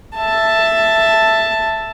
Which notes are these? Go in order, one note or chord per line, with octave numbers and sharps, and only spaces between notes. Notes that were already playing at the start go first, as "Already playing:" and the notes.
E5 A5